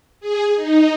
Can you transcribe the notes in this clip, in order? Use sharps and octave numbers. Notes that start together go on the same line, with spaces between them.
G#4
D#4